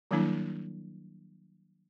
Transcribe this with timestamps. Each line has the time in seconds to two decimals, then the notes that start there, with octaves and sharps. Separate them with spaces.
0.11 D#3 F#3 G3 A#3 D4 E4